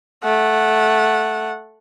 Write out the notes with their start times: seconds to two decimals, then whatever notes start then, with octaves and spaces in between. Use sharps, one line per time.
0.24 A3 F#5